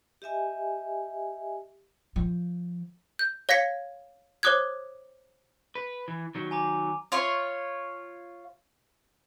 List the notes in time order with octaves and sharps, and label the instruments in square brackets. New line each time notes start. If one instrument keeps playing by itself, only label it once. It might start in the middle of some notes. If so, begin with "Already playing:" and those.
[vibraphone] G4 D#5 E5 G#5
[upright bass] F3
[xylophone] G6
C#5 F5 G#6 B6 C#7
C5 C#5 D6 D#6 F#6 G#6
[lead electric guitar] B4
E3
D#3 F#3
[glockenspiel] G#5 A#5 D6
[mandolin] F4 C#5